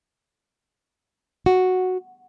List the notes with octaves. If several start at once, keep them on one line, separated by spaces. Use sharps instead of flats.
F#4